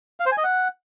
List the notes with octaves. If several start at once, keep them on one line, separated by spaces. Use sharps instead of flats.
F5
C5
G#5
D#5
F#5